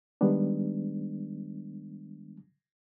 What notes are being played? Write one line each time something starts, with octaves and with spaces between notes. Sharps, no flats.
D#3 G3 G#3 B3 D4